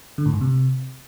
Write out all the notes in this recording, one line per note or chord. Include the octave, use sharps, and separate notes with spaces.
D3
A2
G#2
C3